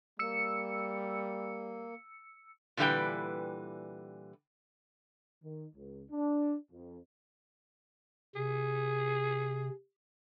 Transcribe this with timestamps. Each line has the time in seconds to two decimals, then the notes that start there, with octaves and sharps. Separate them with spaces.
0.19 G3 A#3 E6 C#7
2.77 A#2 D3 E3 G3 B4 G5
5.43 D#3
5.74 C#2
6.11 D4
6.72 F2
8.35 C3 G#4